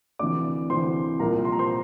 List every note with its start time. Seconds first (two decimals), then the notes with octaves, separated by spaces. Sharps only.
0.19 D2 C3 E3 D5 D6
0.70 D2 C3 E3 C5 C6
1.20 C2 A#2 F3 A#4 A#5
1.45 C6
1.52 A#5
1.59 C5 C6